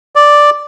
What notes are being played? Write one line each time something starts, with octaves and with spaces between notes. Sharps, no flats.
D5